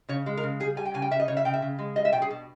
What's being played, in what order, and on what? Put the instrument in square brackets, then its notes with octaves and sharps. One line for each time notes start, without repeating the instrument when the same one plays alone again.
[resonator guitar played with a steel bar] C#3 C#5
G#3
A#4
C#3
G3 G#4
G3 G#5
G5
C#3 G#5
G5
C#3 E5
D#5
C#3 C#5
E5
C#3 G5
E5
C#3
G#3
G3 D#5
E5
B2 G5
G#4
B2